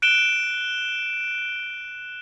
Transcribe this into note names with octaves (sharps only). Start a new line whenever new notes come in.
F#6 D7 E7 G7